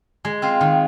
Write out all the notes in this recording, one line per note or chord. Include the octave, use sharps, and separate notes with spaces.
G#3
C4 F4
D#3